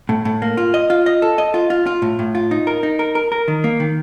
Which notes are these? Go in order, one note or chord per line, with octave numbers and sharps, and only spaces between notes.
A2
A2
A#3
F4
D#5
F4
D#5
A4
D#5
F4
F4
F4
A2
A2
F4
D#4
A#4
D#4
A#4
A#4
A#4
D#3
A#3
D#3